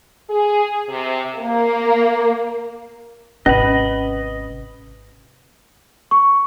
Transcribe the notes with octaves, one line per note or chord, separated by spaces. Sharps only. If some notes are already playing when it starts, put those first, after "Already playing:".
G#4
C3
A#3
G#1 C3 C#4 B4 D#5 B5
C#6